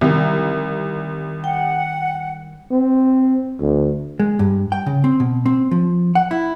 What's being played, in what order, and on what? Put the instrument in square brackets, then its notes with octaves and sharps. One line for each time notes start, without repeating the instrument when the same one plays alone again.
[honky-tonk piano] C2 [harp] D#3 G3
[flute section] F#5 [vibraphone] G5
[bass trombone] C4
D2
[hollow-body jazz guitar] G#3
G2
G5
C#3
C4
B2
C4
F3
F#5
E4